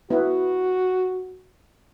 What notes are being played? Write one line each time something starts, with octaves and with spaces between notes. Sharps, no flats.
B3 E4 F#4